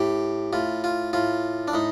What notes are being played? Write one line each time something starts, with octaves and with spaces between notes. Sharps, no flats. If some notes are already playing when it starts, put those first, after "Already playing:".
Already playing: A2 G4
A2 F4
F4
A2 F4
D4
A2 D#4